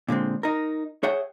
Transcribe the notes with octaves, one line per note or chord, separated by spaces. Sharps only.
A#2 D3 G#3 C4
D#4 A#4
G#4 C#5 E5 F#5 G5